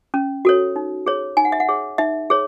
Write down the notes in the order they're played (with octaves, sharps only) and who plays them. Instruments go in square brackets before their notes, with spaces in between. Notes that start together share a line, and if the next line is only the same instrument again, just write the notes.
[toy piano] C#4
F#4 A4 C#5
D#4
G#4 C#5
D#4 G#5
F#5
E5
F#5
G#4 C#5
D#4 E5
G#4 C#5